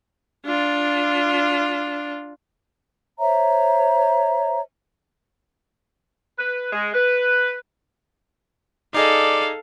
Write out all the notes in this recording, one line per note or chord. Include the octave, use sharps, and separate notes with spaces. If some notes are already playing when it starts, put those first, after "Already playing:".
D4 F4
C5 C#5 E5 A#5
B4
G#3
B4
D#4 G#4 A4 D5 D#5 F5